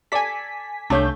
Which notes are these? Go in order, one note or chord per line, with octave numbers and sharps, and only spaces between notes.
A4 D5 G#5 B6
C2 A3 D4 C#5 F5 G6